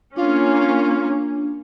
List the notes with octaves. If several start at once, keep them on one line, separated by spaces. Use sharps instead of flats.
A#3 C#4 D4 F4